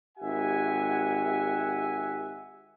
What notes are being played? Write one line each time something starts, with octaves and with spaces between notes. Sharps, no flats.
G#1 G4 E5 F#5 G#5